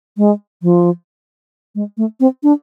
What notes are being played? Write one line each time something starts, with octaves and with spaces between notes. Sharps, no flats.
G#3
F3
G#3
A3
C4
D4